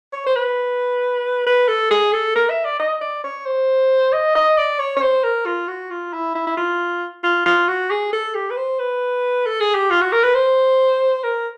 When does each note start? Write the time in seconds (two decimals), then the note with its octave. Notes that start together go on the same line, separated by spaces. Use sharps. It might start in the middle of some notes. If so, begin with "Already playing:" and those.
0.13 C#5
0.26 C5
0.35 B4
1.46 B4
1.68 A4
1.91 G#4
2.13 A4
2.35 A#4
2.50 E5
2.65 D5
2.80 D#5
3.01 D5
3.24 C#5
3.46 C5
4.13 D#5
4.35 D#5
4.58 D5
4.80 C#5
4.97 C#5
5.02 C5
5.24 A#4
5.46 F4
5.68 F#4
5.90 F4
6.13 E4
6.35 E4
6.47 E4
6.57 F4
7.23 F4
7.46 F4
7.68 F#4
7.90 G#4
8.13 A4
8.35 G4
8.50 B4
8.57 C5
8.79 B4
9.46 A4
9.60 G#4
9.75 G4
9.90 F4
10.01 F#4
10.12 A#4
10.24 B4
10.35 C5
11.24 A#4